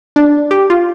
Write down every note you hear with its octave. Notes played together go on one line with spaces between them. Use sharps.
D4
G4
F4